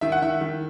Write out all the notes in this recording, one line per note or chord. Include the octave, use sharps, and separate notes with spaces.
D#3 E5
F#5
D#3 E5
D#3